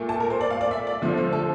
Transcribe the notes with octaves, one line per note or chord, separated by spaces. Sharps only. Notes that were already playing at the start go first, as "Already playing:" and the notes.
Already playing: A#2 A3
A5
A#4
C5
D5
F5
D5
E5
D5
D3 F3 A3 C5
C5
A4